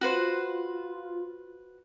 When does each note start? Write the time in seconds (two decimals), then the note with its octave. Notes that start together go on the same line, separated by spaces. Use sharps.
0.01 F4 F#4 B4 C5